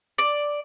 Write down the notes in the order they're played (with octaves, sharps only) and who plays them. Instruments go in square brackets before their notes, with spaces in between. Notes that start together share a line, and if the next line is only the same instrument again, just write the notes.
[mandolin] D5